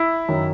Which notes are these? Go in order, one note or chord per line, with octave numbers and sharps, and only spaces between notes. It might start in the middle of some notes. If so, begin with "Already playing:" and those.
Already playing: E4
F#2 D#3 F#3